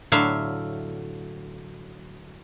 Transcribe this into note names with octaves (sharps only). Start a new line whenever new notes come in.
A2 D3 F#3 E5 F5